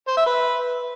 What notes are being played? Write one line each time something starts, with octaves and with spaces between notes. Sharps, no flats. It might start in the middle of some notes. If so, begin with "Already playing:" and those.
C5
E5
B4